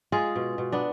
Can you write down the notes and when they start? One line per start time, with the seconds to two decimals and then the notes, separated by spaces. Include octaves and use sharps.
0.12 G#3 F4 G#4
0.36 B2
0.58 B2
0.72 B3 D4